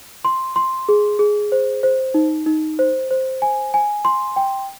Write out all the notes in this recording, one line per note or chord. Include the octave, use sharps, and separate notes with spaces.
C6
C6
G#4
G#4
C5
C5
D#4
D#4
C5
C5
G#5
G#5
C6
G5